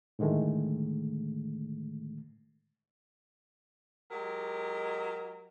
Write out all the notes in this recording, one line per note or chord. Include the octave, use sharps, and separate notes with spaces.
A2 D3 D#3 G#3 A3
F#3 G#3 G4 A#4